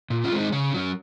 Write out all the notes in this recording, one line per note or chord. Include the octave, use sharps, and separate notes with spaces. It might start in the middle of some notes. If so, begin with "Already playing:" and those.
A#2
C#4 F4
G#3 C4
D#4
C#3 C#4
F#3 C#4